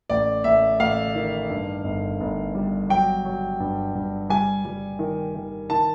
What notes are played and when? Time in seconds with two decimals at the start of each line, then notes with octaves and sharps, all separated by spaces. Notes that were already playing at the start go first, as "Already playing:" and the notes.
0.10 A1 D5
0.44 A1 E5
0.80 A1 F5
1.15 D#3
1.50 G2
1.84 G1
2.20 G1
2.55 G3
2.89 F#3 G5
3.25 F#3
3.60 G2
3.95 G2
4.30 G3 G#5
4.65 G3
4.99 D#3
5.35 D#3
5.70 D#3 A5